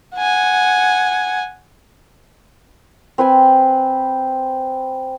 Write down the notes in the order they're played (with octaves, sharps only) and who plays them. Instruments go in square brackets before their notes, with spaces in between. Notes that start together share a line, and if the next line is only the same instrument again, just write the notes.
[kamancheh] F#5 G#5
[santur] C4 B4 C5 G#5